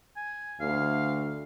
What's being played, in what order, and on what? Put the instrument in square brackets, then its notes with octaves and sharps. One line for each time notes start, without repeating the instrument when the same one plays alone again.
[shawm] G#5
[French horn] D2 [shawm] F5